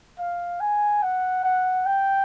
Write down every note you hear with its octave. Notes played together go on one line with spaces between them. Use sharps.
F5
G#5
F#5
F#5
G5